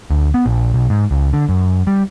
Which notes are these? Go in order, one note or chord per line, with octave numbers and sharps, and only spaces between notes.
D2
B3
A#1
B1
G#2
C#2
D3
F#2
G3